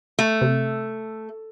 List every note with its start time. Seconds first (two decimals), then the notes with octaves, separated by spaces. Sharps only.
0.19 A3
0.41 C3